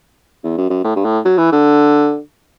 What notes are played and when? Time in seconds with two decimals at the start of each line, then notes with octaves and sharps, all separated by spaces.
0.44 E2
0.58 F#2
0.70 F#2
0.84 A2
0.96 G2
1.05 A2
1.25 F#3
1.38 E3
1.52 D3